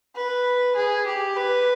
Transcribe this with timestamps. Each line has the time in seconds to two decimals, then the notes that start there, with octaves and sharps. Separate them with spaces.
0.16 B4
0.76 G#4
1.06 G4
1.37 B4